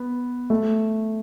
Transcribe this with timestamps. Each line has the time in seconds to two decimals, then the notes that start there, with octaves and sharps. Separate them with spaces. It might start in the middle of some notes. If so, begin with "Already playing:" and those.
Already playing: B3
0.50 A3